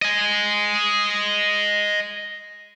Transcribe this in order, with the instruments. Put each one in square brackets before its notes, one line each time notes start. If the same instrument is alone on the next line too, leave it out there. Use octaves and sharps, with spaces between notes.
[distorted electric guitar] D#5 G#5